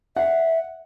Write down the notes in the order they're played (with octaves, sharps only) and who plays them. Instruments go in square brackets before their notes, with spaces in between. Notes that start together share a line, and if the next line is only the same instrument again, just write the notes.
[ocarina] E5 [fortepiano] F#5